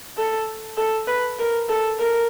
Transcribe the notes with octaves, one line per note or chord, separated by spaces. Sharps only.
A4
A4
B4
A#4
A4
A#4